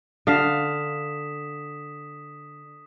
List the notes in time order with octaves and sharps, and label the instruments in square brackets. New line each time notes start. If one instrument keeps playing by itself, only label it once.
[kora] D3 F5 [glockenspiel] D#6 B6 E7